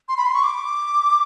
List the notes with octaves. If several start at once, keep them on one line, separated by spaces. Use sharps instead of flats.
C6
B5
C6
C#6
D6